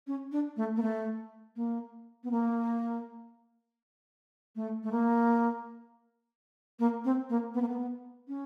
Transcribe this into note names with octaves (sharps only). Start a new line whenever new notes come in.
C#4
D4
A3
A#3
A3
A#3
B3
A#3
A3
A3
A#3
A#3
C4
A#3
B3
A#3
B3
C#4